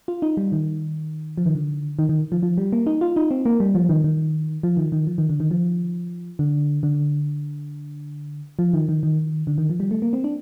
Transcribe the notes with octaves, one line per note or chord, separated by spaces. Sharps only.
F4
D#4
G3
D#3
F3
D#3
D3
D#3
D#3
F3
F3
G3
A#3
D#4
F4
D#4
C4
A#3
G3
F3
D#3
D#3
F3
D#3
D#3
F3
D#3
D3
D#3
F3
D3
D3
F3
D#3
D#3
D#3
D3
D#3
F3
G3
A3
A#3
C4
D4